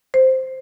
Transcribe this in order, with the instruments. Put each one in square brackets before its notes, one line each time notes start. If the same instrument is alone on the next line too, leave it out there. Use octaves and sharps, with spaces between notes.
[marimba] C5